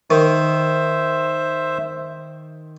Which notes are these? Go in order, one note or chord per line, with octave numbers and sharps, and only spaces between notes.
D#3 C5 E5